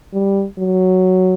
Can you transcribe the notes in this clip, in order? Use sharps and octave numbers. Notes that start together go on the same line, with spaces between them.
G3
F#3